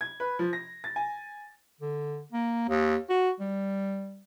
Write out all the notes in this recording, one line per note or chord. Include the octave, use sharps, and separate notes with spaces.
G#6
B4
F3
A#6
A6
G#5
D3
A#3
D#2
F#4
G3